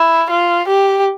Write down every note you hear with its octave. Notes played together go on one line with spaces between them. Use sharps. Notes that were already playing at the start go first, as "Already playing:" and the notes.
Already playing: E4
F4
G4